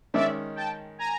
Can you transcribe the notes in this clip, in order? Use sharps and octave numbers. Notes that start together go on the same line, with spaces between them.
D#3 G#3 C#4 D5 E5
G5 A5
G#5 A#5